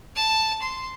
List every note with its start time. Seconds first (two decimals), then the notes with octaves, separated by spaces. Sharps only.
0.16 A5
0.62 C6